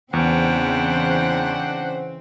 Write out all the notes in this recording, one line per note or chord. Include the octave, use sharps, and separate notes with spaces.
E2 C#3 E3 C4 D4 C5 F#5 G5